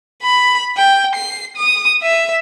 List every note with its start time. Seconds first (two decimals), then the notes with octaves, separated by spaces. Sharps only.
0.23 B5
0.77 G5
1.16 C7
1.57 D#6
2.02 E5